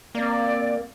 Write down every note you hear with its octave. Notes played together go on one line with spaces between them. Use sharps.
A#3 C4 D5